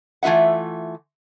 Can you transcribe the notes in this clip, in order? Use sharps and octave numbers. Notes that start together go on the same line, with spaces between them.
E3 A3 F4 E5 F#5